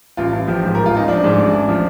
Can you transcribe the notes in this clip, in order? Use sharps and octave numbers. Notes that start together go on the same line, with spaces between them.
A1 F4
A1
F3 G4
G#2 G4
A1 A#4
F4
A1 D#4
F3 D4
G#2
A1
A1
F3